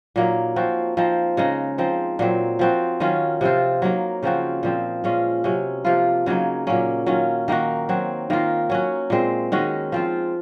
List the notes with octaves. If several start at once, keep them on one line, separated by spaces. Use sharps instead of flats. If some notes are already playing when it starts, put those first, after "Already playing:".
A#2 F#3 A#3 D#4
F3 C4 F#4
F3 C4 D#4
C#3 G#3 D#4
F3 C4 D#4
A#2 F#3 C4
F3 C4 F#4
D#3 F#3 C#4 F4
C3 F3 C4 F4
F#3 A#3 D#4
C#3 F3 C4 F#4
A#2 F3 C4
A#2 G#3 C#4 F4
C3 F#3 C#4
C3 F3 A#3 F4
C#3 F#3 A#3 D#4
A#2 F#3 A#3 C#4
D#3 F#3 C#4 F4
D#3 A#3 D#4 F#4
F#3 C4 F#4
D#3 A#3 F4
F#3 C#4 F#4
A#2 G#3 C4
D#3 G#3 C#4 F#4
F3 C4 F4